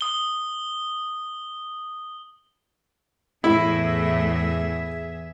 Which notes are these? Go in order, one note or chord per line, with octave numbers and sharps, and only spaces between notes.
D#6 G7
E2 A2 E4 G#4 E5